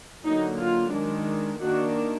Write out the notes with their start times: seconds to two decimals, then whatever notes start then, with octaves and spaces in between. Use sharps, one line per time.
0.25 D3 F#3 A#3 D#4
0.59 F4
0.93 D#3 G#3 D4
1.60 D#3 A#3 D4 F#4